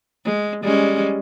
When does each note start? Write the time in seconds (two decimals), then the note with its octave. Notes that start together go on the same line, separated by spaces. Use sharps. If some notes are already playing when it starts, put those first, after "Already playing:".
0.25 G#3
0.62 G3 G#3 C#4